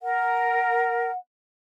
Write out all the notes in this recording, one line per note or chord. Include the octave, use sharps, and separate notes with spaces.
A#4 F#5